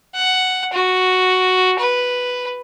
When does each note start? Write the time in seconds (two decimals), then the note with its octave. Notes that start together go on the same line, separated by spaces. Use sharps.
0.15 F#5
0.73 F#4
1.79 B4